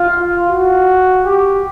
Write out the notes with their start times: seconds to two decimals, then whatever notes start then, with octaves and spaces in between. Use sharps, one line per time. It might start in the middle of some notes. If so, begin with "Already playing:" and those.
Already playing: F4
0.50 F#4
1.25 G4